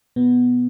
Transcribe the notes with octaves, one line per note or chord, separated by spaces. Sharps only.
B2 B3